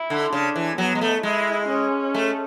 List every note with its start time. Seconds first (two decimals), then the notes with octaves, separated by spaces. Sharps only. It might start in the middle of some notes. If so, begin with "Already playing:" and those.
Already playing: E4
0.10 D3
0.33 C#3 D4
0.56 E3
0.78 F#3 B3
0.95 G#3
1.01 A3
1.23 G#3 E4
1.68 C#4
2.14 A3